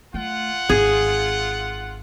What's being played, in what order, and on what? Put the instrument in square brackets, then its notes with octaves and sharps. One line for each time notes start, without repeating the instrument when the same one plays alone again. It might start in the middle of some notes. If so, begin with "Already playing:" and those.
[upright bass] A3 [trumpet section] F4 F#5
[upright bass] G#1 [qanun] G#4